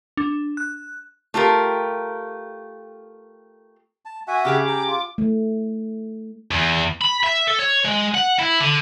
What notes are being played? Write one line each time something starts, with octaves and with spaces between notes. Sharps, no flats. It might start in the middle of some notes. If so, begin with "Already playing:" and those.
D4
F#6
A3 F4 G4 A#4
A5
F#4 E5 F#5 G#5
C#3 G4 G#4 D6
G5 A#5
F4
A3
E2
B5
E5
A4
C#5
G#3
F#5
E4
D3